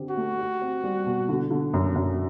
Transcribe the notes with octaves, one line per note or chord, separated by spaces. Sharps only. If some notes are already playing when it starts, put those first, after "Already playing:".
Already playing: D3 C4 G4
F#4
A3
G4
C4
G3
B2
D3
D3
F#2
F#2